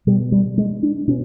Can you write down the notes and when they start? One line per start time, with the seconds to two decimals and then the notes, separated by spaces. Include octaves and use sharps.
0.07 B2 G3
0.32 G3
0.58 G#3
0.83 D4
1.08 B2 C#4